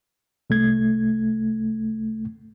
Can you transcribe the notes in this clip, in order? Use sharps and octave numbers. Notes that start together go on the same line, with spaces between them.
C2 A3 G#6